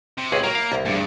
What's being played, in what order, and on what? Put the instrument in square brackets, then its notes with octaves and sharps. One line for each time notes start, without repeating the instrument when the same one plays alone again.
[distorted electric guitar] C3
[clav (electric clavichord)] C#2 G#4 [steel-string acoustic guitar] G4 C#5 [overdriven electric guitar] B4
[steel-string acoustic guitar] F#3 [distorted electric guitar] A#3 [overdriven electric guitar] A#5
[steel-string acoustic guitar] E4 [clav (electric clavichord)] F5
[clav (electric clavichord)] C2 [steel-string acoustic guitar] B3
[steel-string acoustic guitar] E2 [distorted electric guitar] G2 [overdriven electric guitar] A3 D4